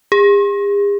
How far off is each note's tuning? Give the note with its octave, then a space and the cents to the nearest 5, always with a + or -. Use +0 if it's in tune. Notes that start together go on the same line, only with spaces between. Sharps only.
G#4 -45